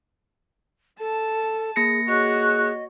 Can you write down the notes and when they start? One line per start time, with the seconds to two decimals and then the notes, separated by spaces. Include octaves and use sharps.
1.00 A4 A5
1.76 A#3 G#4 A#6 C#7
2.08 F#4 G#4 C#5 D#5 F#6